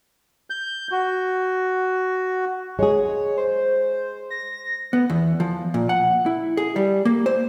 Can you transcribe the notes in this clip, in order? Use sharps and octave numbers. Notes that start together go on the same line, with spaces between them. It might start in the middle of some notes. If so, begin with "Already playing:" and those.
G6
F#4
G#3 G#4 C#5
C5
A#6
B3
E2
F3
A#2
F#5
E4
G#4
G3
A#3
C5